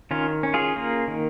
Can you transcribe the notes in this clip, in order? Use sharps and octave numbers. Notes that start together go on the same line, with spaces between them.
D#3 C#4 F4
C#4
F4 G#4
A#3
D#3